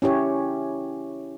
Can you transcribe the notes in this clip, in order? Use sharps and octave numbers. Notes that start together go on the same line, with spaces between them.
C#4 E4 G4 C#5